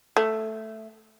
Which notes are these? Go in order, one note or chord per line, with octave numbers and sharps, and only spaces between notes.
A3